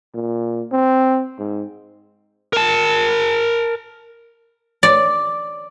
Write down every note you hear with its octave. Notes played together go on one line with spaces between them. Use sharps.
A#2
C4
G#2
A#4 A5
D5